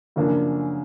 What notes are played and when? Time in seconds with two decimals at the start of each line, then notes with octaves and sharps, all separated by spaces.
0.16 F#2 C#3 F3 A#3 D4